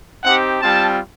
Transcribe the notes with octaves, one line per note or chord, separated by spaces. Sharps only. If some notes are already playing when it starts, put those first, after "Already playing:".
C4 D#4 G4 F#5
G3 C4 F4 A5